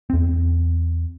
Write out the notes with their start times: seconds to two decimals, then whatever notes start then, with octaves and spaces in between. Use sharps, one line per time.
0.10 E2 C4